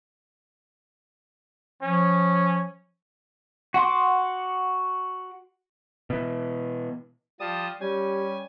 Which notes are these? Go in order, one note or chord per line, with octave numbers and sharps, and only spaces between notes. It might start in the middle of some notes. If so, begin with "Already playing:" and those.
F3 C#4
F#4 F#5 C6 D6
B2 E3
F3 G3 A5 D#6
G3 C#4 G4 G#5